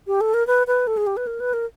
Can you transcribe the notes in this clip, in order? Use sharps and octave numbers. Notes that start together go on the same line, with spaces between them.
G4
A4
A#4
B4
B4
A4
G#4
G4
B4
A#4
B4
A#4